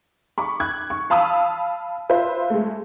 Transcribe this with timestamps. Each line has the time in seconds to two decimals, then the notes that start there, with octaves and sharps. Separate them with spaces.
0.38 B5 C#6 D6
0.60 F#6 G#6
0.90 C#6
1.10 F5 A5 B5 D#6 E6
2.09 F4 B4 C5 E5
2.50 G#3 A3